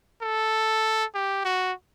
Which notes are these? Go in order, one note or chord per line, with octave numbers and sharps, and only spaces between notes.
A4
G4
F#4